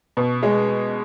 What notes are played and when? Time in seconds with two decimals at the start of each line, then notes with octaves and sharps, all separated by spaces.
0.17 B2
0.43 G#3